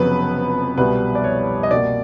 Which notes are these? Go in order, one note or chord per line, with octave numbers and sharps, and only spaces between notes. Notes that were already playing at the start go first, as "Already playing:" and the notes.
Already playing: F1 F2 C#3 F#3 B3 B4
C2 B2 G3 B3 B4
D5
C#5
D#5
C2 B2 G3 A#3 D5